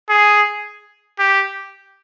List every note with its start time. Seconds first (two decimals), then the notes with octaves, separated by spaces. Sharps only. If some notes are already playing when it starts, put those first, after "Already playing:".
0.09 G#4
1.19 G4